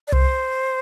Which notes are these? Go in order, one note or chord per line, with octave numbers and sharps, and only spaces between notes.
D5
C2 C5